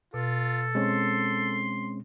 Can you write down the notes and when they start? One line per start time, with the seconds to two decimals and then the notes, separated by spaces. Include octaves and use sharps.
0.14 B2 F4 A4
0.75 G#3 C4 C#4 C6